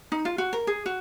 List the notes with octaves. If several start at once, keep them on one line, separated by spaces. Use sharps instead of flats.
D#4
F4
F#4
A#4
G#4
F#4